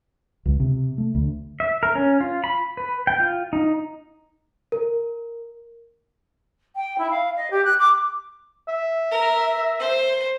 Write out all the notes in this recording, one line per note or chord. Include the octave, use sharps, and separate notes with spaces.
C#2
C3
A3
D2
E5
A#4
C#4
F4
B5
B4
G5
F4
D#4
A#4
G5
E4
F5
D#5
G4
F#6
D6
E5
A#4
C5